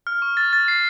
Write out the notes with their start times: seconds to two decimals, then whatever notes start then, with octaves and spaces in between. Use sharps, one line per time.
0.07 F6
0.22 C#6
0.37 A6
0.53 A6
0.68 C7